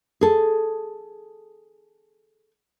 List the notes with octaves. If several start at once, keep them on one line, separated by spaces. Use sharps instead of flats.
G#4 A4